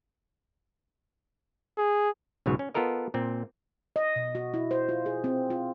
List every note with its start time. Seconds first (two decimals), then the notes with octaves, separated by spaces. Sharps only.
1.78 G#4
2.46 B1 G#2 C#3 F#3 C#5
2.59 C#4
2.74 B3 F4 A4 A#4 D#5
3.14 A#2 C4
3.96 D#5
4.16 B2
4.35 F#4
4.54 E4
4.71 C5
4.89 F4
5.06 G#4
5.24 C4
5.50 F4